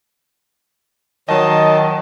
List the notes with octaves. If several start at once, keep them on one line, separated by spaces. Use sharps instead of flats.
D#3 F#3 C#5 D#5 A5